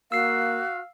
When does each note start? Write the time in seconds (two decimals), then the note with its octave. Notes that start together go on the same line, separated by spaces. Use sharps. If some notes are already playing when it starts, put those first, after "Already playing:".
0.12 A#3 F#4 F5 E6 C7